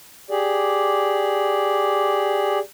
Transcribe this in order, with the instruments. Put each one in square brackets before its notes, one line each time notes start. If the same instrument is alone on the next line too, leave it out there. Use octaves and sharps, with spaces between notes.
[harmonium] G4 G#4 D5